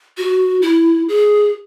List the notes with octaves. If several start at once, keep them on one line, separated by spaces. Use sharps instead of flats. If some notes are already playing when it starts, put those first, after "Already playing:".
F#4
E4
G#4